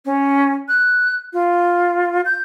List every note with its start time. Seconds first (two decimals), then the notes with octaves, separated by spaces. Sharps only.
0.05 C#4
0.68 F#6
1.33 F4
2.25 G6